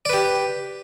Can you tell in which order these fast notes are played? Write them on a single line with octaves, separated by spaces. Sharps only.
D5 B4 G4